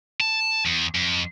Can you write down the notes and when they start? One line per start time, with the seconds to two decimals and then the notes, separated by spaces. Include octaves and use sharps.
0.21 A5
0.65 E2
0.95 F2